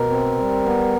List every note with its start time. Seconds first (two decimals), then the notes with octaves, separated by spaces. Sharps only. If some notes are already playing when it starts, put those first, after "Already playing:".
Already playing: B2 A#4
0.10 C4
0.38 G3
0.65 B3